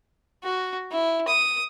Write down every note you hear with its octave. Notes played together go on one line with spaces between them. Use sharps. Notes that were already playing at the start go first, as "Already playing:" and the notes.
F#4
E4
D#6